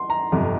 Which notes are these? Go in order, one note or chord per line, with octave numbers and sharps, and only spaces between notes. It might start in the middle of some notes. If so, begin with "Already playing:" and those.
Already playing: C6
A#5
G1 F2 C3